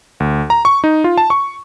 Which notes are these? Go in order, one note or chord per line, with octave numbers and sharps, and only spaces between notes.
D2
A#5
C#6
D#4
F4
A5
C#6